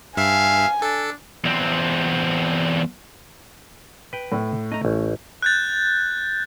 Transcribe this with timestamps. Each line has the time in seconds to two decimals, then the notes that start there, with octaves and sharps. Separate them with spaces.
0.17 G2 E5 F5 G#5
0.82 D4 A4
1.44 E2 C4
4.13 B4 G5
4.32 A2
4.72 A3 D#5 A#5
4.85 A1
5.42 F#6 G6 A6